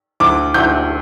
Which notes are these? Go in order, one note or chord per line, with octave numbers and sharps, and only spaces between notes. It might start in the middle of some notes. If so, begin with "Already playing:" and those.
D2 D6
D2 G6